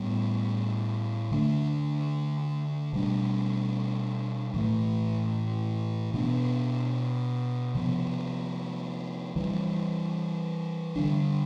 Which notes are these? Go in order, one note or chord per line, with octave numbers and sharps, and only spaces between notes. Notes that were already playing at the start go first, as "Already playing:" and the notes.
Already playing: A2 G3 B3
D3 A3 D4
B2 G3 D4
A2 E3 A3
B2 B3 D4
C3 F3 B3
E3 G3 C4
D3 G3 D4